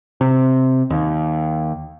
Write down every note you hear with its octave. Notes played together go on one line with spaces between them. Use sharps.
C3
D#2